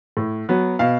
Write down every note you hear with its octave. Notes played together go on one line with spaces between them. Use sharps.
A2
F#3 B3
B2 F5